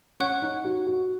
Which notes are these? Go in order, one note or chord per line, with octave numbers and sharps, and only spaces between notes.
C#4 C#5 F#5 C#6 F#6
D#4
F#4
F#4